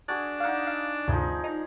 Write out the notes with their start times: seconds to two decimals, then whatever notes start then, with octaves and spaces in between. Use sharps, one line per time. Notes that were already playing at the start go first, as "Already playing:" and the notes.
0.09 D4 F#4 G#4
0.40 D#4 D5 F5 F#5
0.67 F5
1.08 D2 G2 C3 F3 D#4 G#4
1.44 D#4 A#5